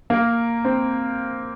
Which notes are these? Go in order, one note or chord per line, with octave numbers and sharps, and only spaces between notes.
A#3
C4